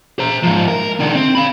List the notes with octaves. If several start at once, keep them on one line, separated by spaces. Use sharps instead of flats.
C5 A#5
G#2 F3
A#4
D3 D#3
C4
F5 B5